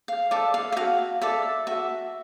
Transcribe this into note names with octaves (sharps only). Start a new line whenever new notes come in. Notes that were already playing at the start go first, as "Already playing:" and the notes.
F5
A4 D5 E5
F5
E5
F#4 F5
A4 D5 E5
F#4 E5